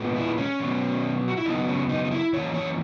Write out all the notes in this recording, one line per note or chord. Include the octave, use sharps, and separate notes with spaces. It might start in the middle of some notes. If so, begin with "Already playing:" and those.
Already playing: A#2 G#3 B3
E4
C#4
B2 F#3 B3
F#4
E4
F#2 C#3 F#3 B3 D#4
C#4
D#4
D#4
E4
F#2 E3 A#3 C#4 C#5
C#5